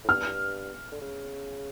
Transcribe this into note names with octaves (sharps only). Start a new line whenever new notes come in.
A2
G2 F6
D3
C#3